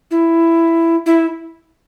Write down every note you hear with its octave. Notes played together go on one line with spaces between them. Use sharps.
E4
E4